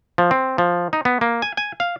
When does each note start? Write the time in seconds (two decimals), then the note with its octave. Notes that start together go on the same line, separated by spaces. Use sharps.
0.18 F3
0.31 C4
0.58 F3
0.93 D#4
1.05 B3
1.21 A#3
1.42 G#5
1.57 G#5
1.80 F5